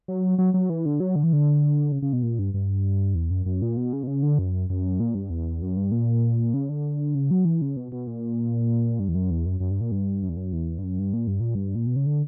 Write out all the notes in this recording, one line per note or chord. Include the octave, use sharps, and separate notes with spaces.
F#3
F#3
F#3
E3
D3
F#3
D3
E3
D3
C#3
C#3
B2
A#2
G2
G2
E2
F#2
F#2
A#2
B2
C#3
B2
C#3
D3
F#2
F#2
A#2
G2
E2
F#2
G2
A#2
C#3
D3
C#3
F#3
E3
C#3
B2
B2
A#2
G2
E2
F#2
E2
F#2
F#2
G2
A#2
G2
F#2
E2
F#2
E2
G2
F#2
G2
A#2
G2
A#2
G2
A#2
B2
C#3
D3